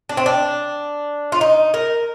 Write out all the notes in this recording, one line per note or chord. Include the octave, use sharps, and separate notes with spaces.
D4
C4
D4
F4
D#4
A#4